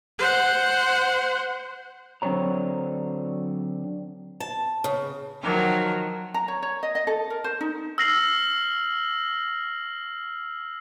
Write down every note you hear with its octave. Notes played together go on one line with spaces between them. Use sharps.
C5 F#5
D3 F#3 C4 D4 C#5 A#5
A5
C#3
D#3 F3 F#3 A#4
A#5
C#5
C#5
D#5
D#5
A4
A#4
C5
D#4
E6 F6 A#6 C7 F#7